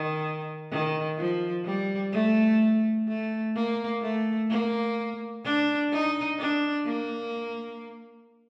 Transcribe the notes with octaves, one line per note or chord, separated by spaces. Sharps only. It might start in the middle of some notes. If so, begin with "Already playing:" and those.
Already playing: D#3
D#3
F3
G3
A3
A3
A#3
A3
A#3
D4
D#4
D4
A#3